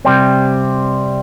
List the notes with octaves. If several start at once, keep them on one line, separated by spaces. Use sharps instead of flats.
C3 G3 C4